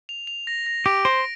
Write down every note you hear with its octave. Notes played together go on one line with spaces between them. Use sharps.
F7
F7
A#6
A#6
G4 D7
C5 A#6